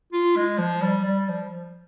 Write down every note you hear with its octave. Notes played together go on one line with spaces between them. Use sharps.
F4
G#3
F3
G3
G3
F3